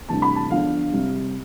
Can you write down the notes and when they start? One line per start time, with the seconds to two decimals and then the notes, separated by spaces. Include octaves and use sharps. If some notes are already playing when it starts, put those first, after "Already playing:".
0.09 D2 C3 E3 G3 A5
0.22 B5
0.35 A5
0.50 E2 D3 F3 F5
0.92 C2 C3 G3